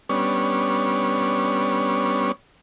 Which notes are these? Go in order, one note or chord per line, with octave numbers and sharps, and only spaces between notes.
G3 B3 C#4 D4 C#5